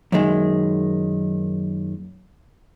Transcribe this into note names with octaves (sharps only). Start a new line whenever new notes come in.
F#2 A#2 D#3 G#3